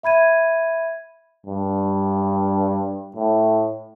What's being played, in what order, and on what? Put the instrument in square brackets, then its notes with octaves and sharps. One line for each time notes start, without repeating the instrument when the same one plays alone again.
[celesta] E5 B5 G#6 D#7
[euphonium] G2
A2